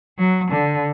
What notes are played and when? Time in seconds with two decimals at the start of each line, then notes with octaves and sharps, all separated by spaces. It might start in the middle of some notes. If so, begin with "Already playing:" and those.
0.18 F#3
0.51 D3